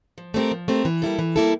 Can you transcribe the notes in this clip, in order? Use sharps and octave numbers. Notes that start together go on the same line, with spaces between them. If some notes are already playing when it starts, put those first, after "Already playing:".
F3
A3 C4 G4 A#4
F3
A3 C4 G4 A#4
E3
G3 A#3 E4 A4
E3
G3 A#3 E4 A4